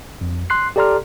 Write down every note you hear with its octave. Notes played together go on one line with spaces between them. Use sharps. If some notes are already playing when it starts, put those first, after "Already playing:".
F2
C6 F#6 C7
G4 A4 D5 A#5 C6 F6